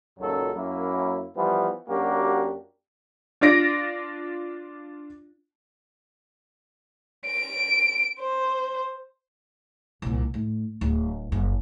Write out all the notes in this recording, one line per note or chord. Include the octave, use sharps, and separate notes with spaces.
C#2 F#2 A#2 D#3 F#3 A4
F#2 A#3 E4
E3 F3 G3 B3
F#2 A#3 D4 F#4 G4
D4 F4 D5 A#6 D7
D7
C5
C2 A#2
A2
D1
F#1